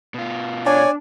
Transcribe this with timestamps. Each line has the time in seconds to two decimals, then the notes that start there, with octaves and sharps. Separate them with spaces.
0.14 B2 F4
0.66 D4 C#5 D5 G#5